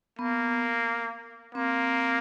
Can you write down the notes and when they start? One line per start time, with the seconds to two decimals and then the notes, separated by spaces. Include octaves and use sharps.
0.19 A#3 B3
1.55 A#3 C4